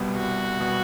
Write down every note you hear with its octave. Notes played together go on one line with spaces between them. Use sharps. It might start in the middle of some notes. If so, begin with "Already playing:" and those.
Already playing: C2 B2 G3 B3
C2 F#4
B2 G3 B3